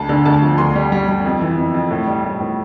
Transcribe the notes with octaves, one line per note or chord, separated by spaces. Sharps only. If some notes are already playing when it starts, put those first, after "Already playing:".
Already playing: D2 A5
D3
D2 A5
F3
D2 C6
G3
G3
G3
F2
E3
F2
F2
A2
G3
A2
A2